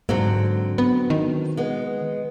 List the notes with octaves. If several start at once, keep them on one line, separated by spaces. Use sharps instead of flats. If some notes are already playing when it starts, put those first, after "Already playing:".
G#2 D3 F#3 C4
B3
D#3
G#3 B3